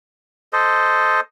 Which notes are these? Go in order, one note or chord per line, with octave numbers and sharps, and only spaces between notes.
A4 C5 D#5